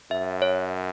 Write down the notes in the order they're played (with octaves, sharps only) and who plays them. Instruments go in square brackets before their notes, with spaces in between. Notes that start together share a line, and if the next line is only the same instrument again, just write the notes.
[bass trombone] F#2 [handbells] E5
[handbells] C#5